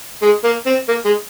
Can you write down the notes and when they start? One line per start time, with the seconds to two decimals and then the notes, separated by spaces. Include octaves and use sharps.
0.23 G#3
0.44 A#3
0.66 C4
0.88 A#3
1.05 G#3